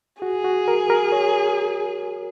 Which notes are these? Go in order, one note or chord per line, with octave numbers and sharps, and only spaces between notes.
F#4 G#4
F#4
A#4
A#4
C#5